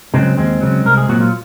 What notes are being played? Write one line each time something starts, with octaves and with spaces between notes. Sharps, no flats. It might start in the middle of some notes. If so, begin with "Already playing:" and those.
C#3 F#3 G#3 C4
D#2 G#3 C4
C#3 F#3
C2 A#4
G#4
A#2 F#3 F#4
F4